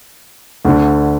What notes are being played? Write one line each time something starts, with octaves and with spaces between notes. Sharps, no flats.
D2 D3